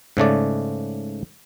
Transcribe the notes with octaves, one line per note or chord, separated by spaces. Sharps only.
G#2 C#3 A3 D5